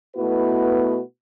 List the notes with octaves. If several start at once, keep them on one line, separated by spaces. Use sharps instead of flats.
B2 A3 B3 E4 F#4 B4